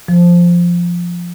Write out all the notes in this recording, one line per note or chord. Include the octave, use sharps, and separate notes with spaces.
F3